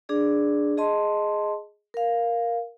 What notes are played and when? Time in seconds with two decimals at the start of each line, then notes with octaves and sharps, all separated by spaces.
0.09 D4 G#4 D5
0.77 G#4 D#5 A5 C6
1.94 A#4 F5